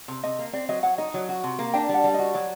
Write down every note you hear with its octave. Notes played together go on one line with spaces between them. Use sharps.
C3
C3 D#5
A#3
C4 D5
F#3 D#5
F#3 F#5
D#4 D#5
F#3
F#4
C3
A#3
D4 G5
G3
F#5
G3
F#4 D#5
F#3 D5